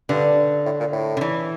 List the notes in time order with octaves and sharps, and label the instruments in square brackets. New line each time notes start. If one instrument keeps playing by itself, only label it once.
[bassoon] G2 [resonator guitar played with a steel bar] D3
[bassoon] A2
A#2
A2
[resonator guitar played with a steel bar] D3
E3